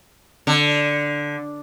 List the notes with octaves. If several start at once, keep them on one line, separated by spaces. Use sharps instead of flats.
D3